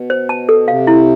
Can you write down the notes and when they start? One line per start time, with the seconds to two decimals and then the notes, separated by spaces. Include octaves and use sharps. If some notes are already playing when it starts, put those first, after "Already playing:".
Already playing: B2
0.10 C5
0.29 A5
0.49 A4
0.68 C3 F5
0.87 E4